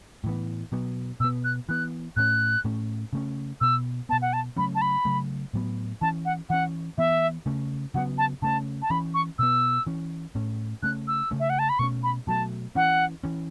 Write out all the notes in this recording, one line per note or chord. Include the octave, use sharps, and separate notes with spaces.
A2 E3 B3
B2 F#3 B3
B2 B3 E6
F#6
E3 B3 F#6
A2 A3 C#4 F#6
A2 A3 C#4
C#3 A3 C#4
B2 B3 E6
B2 B3 A5
F#5
A5
C#3 F#3 A3 C#4 B5
A5
B5
C#3 F#3 A3
A2 F#3 B3
E3 C#4 A5
F#5
E3 C#4 F#5
E3 B3 E5
C#3 A3 C#4
C#3 F#3 B3 F#5
A5
C#3 A3 C#4 A5
A5
E3 C#4 B5
C#6
B2 B3 E6
E3 C#4
A2 A3 C#4
C#3 A3 C#4 F#6
E6
C#3 A3 C#4
E5
F#5
A5
B5
B2 A3 C#4 C#6
B5
B2 F#3 A3 A5
E3 C#4 F#5
E3 C#4